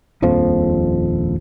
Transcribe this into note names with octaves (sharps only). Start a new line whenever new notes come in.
D#1 A#1 F2 F3